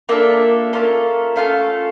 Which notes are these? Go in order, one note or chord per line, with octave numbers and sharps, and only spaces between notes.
A#3 D4 F4 A4 E5
A#3 C#4 F4 A4
A3 C#4 F4 A4 F5